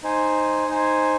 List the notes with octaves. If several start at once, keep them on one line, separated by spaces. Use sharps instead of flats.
D#4 C5 G#5
D#4 C5 G#5